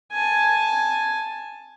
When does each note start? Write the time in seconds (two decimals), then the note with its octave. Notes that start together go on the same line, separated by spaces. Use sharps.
0.12 G#5 A5